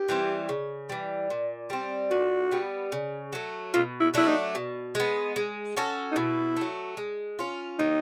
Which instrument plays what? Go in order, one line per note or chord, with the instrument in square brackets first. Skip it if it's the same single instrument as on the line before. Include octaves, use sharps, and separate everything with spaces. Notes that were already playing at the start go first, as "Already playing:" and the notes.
Already playing: [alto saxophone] G4
[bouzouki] E3 G3 C4
C#3
E3 G3
A#2
G3 C4
[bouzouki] A#2 [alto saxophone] F#4
[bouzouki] G3 B3
C#3
F#3 A3
[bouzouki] B2 [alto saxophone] F4
[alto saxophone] E4
[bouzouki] F#3 A3 D4 [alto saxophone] E4
[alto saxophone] D#4
[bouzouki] B2
G#3 B3
G#3
C#4 F#4 A4
[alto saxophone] D#4
[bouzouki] B2 [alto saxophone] E4
[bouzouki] F#3 A3
G#3
C#4 F4
[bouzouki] D#3 [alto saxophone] D#4